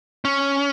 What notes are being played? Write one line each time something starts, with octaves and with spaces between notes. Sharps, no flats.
C#4